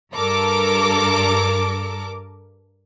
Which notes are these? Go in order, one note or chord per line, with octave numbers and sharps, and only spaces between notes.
G2 A4 A#4 D6